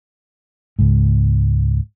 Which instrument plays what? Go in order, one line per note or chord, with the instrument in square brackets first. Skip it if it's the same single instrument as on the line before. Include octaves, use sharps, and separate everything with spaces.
[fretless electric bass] C#2 G#2